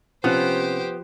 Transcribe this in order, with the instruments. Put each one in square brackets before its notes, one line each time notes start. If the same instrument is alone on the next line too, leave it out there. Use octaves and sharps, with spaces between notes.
[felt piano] C3 C#4 [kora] F3 F#5 [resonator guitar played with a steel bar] B3 [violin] G4 C5